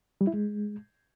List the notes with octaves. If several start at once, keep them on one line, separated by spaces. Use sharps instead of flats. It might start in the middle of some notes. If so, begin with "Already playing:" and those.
G3
E4
G#3